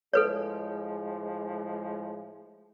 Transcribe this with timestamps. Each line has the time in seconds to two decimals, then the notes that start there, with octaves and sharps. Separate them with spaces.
0.13 A2 F3 G#3 A4 B4 C#5